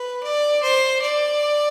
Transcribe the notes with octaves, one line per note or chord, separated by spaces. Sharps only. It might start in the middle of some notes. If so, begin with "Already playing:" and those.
Already playing: B4
D5
C5
D5